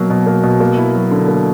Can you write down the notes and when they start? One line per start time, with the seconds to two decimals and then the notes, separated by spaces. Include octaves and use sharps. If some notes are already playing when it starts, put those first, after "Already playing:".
Already playing: B2 F#3 A#3
0.10 B2
0.26 A#3
0.43 B2
0.60 A#3
0.78 E4
0.95 F#3
1.11 D3
1.28 A#3